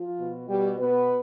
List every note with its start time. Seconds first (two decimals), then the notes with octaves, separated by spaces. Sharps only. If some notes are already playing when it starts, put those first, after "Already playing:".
Already playing: F3 F4
0.17 B2
0.48 B2 G3 G4
0.78 B2 B3 B4